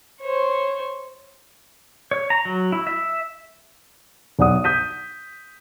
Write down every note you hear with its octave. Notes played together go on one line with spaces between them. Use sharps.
C5 C#5
C#5
A#5
F#3
E4
E5
B1 D5 F#5 D#6
D#6 G6 B6 D#7